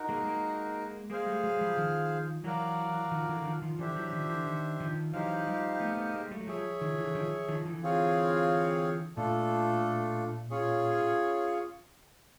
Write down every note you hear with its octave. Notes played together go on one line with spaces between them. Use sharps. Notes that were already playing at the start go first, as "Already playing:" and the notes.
Already playing: D#4 F#4 A#4
G#3 A#3
G#3 A#3
G#3 A#3 G#4 C5 F5
G3 A3
F#3 G#3
F3 G3
D#3 F3
E3 F#3 F#4 A#4 D5 F5
D#3 F3
D3 E3
D#3 F3
D#3 F3
D3 E3 D4 G4 C5 E5
E3 F#3
D#3 F3
D3 E3
D#3
D#3 F3
E3 F#3 D#4 G4 C5 F5
F3 G3
A3 B3
A3 B3
G#3 A#3
G3 A3
F#3
F3 G3 G#4 C#5 E5
D#3 F3
D3 E3
D#3 F3
D#3 F3
D3 E3
C4 F4 G#4 C#5 F5
A#2 A3 D4 F4 A4
C#4 F4 G#4 C#5